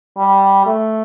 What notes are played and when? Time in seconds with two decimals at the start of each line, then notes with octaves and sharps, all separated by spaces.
0.18 G3
0.66 A3